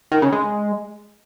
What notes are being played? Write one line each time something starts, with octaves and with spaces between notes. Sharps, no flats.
D#3
C#3
G#3